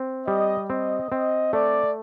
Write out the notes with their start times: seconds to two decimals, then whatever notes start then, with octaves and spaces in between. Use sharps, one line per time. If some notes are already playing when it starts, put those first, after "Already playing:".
Already playing: C4
0.26 G3 D#5
0.70 C4 D#5
1.12 C4 D#5
1.53 A3 D5